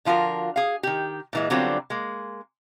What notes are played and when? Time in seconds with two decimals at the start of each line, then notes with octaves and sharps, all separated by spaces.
0.05 D3 F3 F4 F#4 A#4
0.56 G#4 F5
0.83 D#3 G4
1.33 A#2 E3 G#3
1.50 D3 F#3 G3 B3 C4 F4
1.90 G#3 A#3